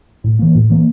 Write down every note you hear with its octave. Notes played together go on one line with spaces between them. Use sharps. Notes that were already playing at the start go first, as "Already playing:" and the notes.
A2
E3 A#3
A2
E3 A#3